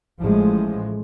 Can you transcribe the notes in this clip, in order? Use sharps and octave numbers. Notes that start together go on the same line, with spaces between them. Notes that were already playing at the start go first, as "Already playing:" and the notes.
A1 A2 F3 G#3